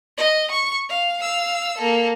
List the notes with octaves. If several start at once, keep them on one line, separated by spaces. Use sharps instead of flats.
D#5
C#6
F5
F5 E6
A#3 A4